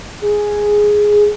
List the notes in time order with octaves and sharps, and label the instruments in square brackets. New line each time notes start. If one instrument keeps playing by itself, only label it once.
[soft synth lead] G#4